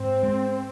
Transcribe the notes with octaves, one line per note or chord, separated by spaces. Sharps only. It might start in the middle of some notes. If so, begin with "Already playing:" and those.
Already playing: G#2 C4
G#3